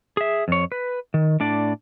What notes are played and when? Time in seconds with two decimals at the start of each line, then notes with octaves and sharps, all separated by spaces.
0.17 G#4 E5
0.48 F2 C#5
0.72 B4
1.14 D#3
1.40 A2 D4 D5